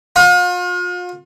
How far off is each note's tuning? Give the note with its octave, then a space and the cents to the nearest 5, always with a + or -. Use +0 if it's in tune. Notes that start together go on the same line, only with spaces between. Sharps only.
F4 +40